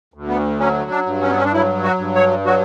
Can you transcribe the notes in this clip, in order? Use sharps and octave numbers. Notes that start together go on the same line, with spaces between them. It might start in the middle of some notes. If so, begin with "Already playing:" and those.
D2
B3
F#3 C#4
D4
G2
C#4
B3
C#4
D4
F#3 E4
F#4
G2
C#5
F#3 F#4